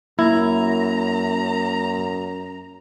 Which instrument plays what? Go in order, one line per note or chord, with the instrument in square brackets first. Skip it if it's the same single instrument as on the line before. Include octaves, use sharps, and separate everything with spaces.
[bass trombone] F#2 [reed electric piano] A#3 [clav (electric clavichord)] E4 [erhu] A#5